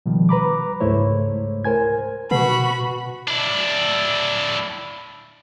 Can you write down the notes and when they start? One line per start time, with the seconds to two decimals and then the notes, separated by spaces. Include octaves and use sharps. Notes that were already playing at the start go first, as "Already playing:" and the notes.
0.06 B2 D#3 F3 G3
0.29 B4 A#5 B5 D6
0.80 C#2 G#2 A3 E4 C5 C#5
1.65 A#4 C5 G#5 G#6
2.31 B2 F#4 B4 F#5 A5 B5
3.28 D4 E4